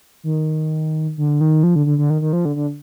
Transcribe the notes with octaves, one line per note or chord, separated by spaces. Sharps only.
D#3
D3
D#3
F3
D3
D3
D3
D#3
D#3
F3
D3
D3